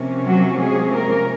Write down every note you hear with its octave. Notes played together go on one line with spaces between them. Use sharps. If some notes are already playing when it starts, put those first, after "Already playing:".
Already playing: C3 F3 A#3 C#4
F#3 F#4
G#3 G#4
A#3 A#4